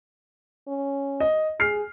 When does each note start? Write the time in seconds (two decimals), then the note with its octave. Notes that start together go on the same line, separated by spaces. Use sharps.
0.68 C#4
1.20 D#5
1.60 G#4 F6 C7